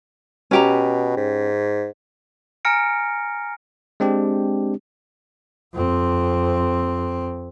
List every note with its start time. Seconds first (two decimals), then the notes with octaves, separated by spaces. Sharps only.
0.51 B2 C#4 G4 A#5
1.17 G#2
2.65 G#5 A#5 F6 A#6 C#7 D7
4.00 G#3 C4 D4 G4
5.74 F2 C4